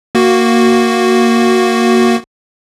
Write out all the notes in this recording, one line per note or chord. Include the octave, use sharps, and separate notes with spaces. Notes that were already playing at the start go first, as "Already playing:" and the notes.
A#3 F#4